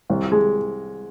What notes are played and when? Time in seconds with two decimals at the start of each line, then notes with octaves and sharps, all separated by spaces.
0.10 C2
0.32 G#3